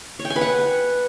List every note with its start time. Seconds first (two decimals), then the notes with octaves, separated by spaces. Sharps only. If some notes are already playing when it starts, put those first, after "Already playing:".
0.19 C#5
0.25 G5
0.30 G#5
0.36 B4
0.41 F#5